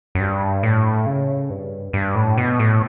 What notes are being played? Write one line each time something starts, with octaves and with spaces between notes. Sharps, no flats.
F#2
G2
A2
C#3
G2
G2
A2
B2
A2